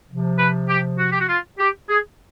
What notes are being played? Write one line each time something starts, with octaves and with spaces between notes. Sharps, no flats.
C3 F3
B4
G4
F#4
G4
F#4
F4
G4
G#4